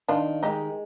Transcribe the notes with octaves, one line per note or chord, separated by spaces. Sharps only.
D#3 D4 F4
G#3 D#4 G4